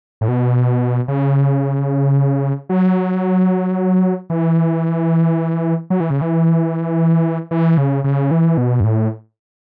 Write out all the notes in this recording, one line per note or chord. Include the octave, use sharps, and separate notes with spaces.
A2
B2
C#3
F#3
E3
F#3
E3
C#3
E3
E3
C#3
C#3
E3
B2
F#2
A2